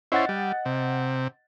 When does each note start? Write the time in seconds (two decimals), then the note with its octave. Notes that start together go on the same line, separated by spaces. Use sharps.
0.12 C#4 E4 C5 D#5 F#5 A6
0.29 G3
0.65 C3